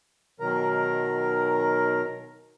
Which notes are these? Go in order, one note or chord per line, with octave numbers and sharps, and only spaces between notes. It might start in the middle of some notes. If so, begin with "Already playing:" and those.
B2 D#3 F#3 A#4 A#5